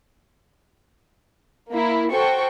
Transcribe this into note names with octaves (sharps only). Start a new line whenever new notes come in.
A#3 E4
F#4 A4 C5 G5 C#6